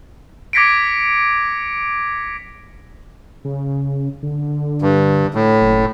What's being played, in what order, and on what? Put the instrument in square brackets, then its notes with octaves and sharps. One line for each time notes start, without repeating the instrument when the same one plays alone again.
[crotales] D6 G#6 A#6 B6 C#7 D7
[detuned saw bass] C#3
D3
[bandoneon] G2
A2
[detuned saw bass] F#1